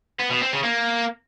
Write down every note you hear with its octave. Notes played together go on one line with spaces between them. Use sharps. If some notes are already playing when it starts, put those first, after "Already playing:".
B3
B2
C4
C#3
A#3